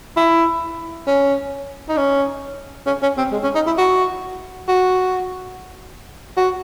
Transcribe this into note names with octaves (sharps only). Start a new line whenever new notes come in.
E4
C#4
D#4
C#4
C#4
C#4
C4
G#3
C#4
D#4
E4
F#4
F#4
F#4